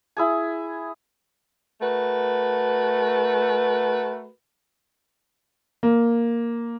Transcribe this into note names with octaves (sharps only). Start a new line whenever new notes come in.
E4 G#4 G#5
A3 F#4 A#4 B4
A#3